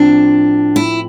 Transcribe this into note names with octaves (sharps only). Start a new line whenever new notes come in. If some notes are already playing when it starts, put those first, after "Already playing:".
Already playing: A2 F3 C4 D4
E4